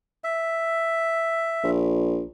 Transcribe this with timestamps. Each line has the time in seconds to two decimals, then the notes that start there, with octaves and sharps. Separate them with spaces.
0.24 E5
1.63 A#1